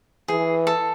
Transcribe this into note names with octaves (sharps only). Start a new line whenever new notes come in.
E3 G#4
A4